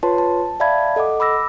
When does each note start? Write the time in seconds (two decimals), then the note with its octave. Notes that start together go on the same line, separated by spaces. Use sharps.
0.03 F4 B4 C#5 A5 C6
0.18 A5
0.60 D5 E5 F5 A5 B5 G#6
0.96 A4 D#5 F#5 D6
1.20 B5 D6 E6 A#6